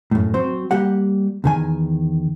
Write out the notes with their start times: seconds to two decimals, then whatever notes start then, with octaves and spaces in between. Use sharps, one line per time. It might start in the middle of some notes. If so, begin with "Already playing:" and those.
0.11 F#2 A2
0.34 F#3 C4 C5
0.71 G3 A#3 G4 F#5
1.44 E2 D#3 G#5